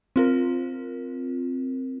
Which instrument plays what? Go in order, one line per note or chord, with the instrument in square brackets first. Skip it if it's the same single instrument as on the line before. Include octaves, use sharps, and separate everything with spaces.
[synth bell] C4 F4 A#4